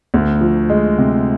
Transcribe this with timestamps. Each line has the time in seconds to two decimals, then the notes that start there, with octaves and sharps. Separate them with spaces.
0.14 D2
0.41 F3
0.70 G#3
0.98 C3